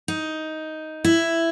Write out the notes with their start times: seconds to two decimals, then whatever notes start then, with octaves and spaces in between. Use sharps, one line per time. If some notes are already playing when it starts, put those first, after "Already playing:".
0.08 D#4
1.04 E4